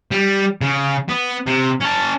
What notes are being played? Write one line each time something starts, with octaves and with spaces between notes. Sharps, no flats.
G3
C#3
B3
C3
C#4 A5